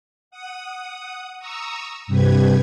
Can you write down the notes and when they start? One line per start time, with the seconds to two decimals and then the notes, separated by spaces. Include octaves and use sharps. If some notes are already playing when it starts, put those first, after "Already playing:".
0.31 F#5 D#6
1.39 A#5 C#6 D#6 E6
2.07 G2 C3 G4 B4 G#6